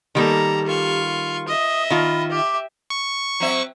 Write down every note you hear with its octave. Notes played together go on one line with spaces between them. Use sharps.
D#3 G3 A#3 G4 A4 A#5
F4 C#6
D#5 E5 D#6
D#3 F4 B5
G4 E5 D6
C#6
F#3 C4 E5